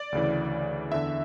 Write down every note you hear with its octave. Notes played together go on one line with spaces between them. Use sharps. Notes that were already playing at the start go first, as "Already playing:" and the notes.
Already playing: D5
D2 C#3 E3
E2 D3 E5